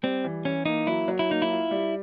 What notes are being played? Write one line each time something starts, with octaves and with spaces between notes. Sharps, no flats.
G3 C4
E3
E3 C#4
A#3 D#4
F#3 E4
F#3
E4
A#3 D#4
E4
F4
G3